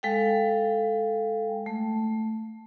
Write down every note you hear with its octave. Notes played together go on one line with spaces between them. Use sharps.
G#3 A4 F5 G5
A3